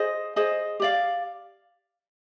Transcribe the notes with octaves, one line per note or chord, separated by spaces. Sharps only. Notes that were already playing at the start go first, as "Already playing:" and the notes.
Already playing: G#4 C5 D#5
G#4 C5 D#5
G4 D5 F5